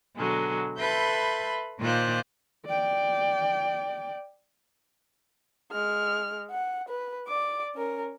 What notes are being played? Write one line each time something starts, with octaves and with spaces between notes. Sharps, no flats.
B2 D3 F#3 G#3
A4 B4 E5 B5 C6 G6
A#2 D#3 F4 C5 D6 F#6
D5 G5
G#3 F6
F#5
B4
D5 D6
C#4 A#4